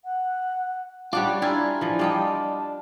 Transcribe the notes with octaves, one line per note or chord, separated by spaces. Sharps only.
F#5
G3 C#4 D4 F4 G4 C#5 F#5 D6
D4 E4 F4 G#5 A#5
E3 F3
G3 F4 D5 D#5 G5 A5